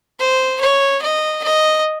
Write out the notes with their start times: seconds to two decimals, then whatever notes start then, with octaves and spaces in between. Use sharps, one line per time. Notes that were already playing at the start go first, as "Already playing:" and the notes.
0.20 C5
0.61 C#5
1.02 D#5
1.44 D#5